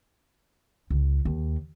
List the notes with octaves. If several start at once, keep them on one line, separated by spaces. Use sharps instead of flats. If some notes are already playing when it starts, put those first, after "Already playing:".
C#2
D#2